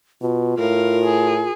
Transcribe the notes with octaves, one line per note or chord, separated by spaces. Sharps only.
B2 F4
A2 A#4 F5
G#4